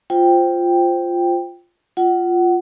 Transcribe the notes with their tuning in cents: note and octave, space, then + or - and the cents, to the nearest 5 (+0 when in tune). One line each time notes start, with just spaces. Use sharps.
F4 +0 C5 +0 G5 +0
F4 +0 F#5 +25